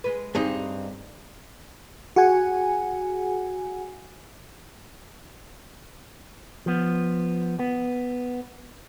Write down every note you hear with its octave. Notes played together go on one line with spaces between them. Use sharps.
G#3 B4
G2 C4 D#4 G#4
F#4 G#4 F#5 G#5
F3 B3
B3